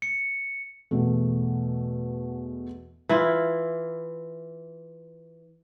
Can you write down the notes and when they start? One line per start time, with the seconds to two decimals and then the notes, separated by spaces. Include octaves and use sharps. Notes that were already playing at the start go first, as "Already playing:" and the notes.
0.02 C#7
0.91 E2 B2 A3
3.09 E3 E4 F4